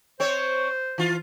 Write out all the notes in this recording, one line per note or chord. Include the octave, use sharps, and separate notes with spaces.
C4 C5 C#5
E3 F4